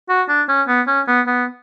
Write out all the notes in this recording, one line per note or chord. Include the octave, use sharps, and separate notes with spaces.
F#4
D4
C#4
B3
C#4
B3
B3